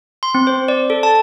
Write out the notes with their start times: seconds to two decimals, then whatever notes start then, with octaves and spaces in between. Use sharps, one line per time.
0.23 C6
0.35 C4
0.47 C5
0.68 D5
0.90 A4
1.03 A5